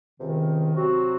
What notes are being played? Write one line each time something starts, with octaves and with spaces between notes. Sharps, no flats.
C#2 C3 D#3
C3 F#3 C4 F#4